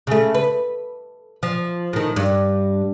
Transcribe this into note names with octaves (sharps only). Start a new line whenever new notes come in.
C#3 A3
B4
F3
A2 D#3
G2